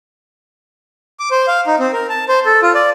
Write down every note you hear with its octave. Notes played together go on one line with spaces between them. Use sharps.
D6
C5
F5
D#4
C4
A#4
A5
C5
A4
F4
D5